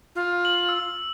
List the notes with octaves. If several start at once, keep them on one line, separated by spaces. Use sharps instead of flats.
F4
F#7
E6